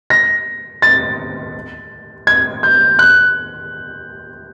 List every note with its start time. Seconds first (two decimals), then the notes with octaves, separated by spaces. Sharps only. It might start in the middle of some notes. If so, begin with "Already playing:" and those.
0.10 A#6
0.82 A6
2.27 G#6
2.63 G6
2.99 F#6